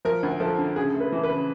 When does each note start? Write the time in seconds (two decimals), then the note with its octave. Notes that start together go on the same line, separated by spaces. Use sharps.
0.05 F3 A#4
0.23 D2
0.40 F3 A4
0.58 D3
0.76 C#3 G#4
0.94 A3
1.00 B4
1.12 E3
1.24 B4
1.30 C#3